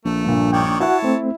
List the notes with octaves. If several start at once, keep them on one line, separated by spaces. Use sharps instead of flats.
A#1 A3
G2 A#2
D#3 C#5 D5 G5
E4 F#4 C#5 F#5 A5
A3 C4